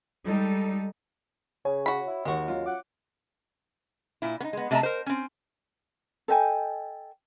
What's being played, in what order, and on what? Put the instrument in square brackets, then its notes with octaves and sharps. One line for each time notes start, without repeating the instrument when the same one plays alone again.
[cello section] G3 G#3 D#4 A4
[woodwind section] C#3 [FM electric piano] C#5 [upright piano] G#5
[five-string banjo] F#4 B5
[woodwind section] E4
[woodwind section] D#2 [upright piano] D#3 [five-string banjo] G#3 F#4
[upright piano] F#3 C#4 F4
[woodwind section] F#5 D6
[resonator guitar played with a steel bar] A#2 E4
B3 D#4
G#3 B3
C3 A3 D#5 E5 A5 A#5
A#4 C5
C4 C#4
[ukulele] A4 D#5 G5 G#5